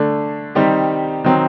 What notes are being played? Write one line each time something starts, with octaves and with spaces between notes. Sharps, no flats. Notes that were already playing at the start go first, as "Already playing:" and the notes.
Already playing: D3 A3 D4
D#3 G3 C4 D#4 G4
D#3 F#3 C4